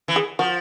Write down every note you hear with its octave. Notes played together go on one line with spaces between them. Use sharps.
E3
G#4
F3 F#4